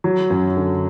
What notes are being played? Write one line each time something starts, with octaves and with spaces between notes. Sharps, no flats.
F#3
F#2
D3